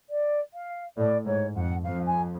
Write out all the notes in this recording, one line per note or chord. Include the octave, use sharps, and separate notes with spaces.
D5
F5
A2 D5
G#2 C#5
F2 F#5
F2 F5
G#5